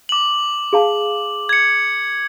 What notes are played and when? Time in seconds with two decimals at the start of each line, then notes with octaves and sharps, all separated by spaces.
0.09 D6 F#7
0.73 G#4 F5 A5
1.49 G#6 C#7